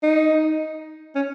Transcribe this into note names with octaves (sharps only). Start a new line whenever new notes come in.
D#4
C#4